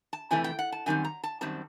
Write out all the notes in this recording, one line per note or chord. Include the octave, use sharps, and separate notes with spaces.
A5
F2 C3 E3 A3 G#5
G5
F#5
A5
F#2 D#3 G3 C4 G#5
A#5
A5
F#2 D#3 G3 C4 A5